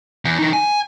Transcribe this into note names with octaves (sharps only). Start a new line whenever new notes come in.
E2
E3 D#4
G#5